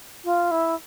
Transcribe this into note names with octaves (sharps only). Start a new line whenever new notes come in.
F4
E4